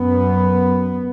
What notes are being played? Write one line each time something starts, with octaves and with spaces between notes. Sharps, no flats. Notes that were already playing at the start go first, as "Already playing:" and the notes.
Already playing: F#2 B3